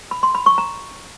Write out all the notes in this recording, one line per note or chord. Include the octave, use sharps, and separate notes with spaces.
B5
C6
B5
C#6
A#5